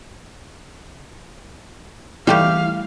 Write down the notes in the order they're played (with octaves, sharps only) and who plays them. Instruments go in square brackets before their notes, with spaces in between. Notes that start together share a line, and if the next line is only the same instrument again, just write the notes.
[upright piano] E3 [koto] G3 A3 G4 [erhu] F5